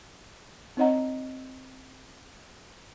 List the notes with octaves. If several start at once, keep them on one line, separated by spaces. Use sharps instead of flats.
C4 D#4 C#5 D#5 F#5 A#5